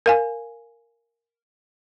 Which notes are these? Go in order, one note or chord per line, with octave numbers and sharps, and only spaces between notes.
A#4 F5 G#5